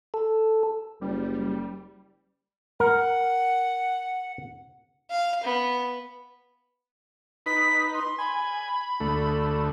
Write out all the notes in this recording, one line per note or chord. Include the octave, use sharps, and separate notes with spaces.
A4
F#1 G3
A#4 F#5
F5
B3
D#4 B4 B6
C6
G#5 B5
D2 A3